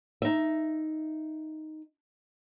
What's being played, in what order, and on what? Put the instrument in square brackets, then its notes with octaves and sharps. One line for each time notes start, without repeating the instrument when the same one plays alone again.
[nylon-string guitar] D#4 E5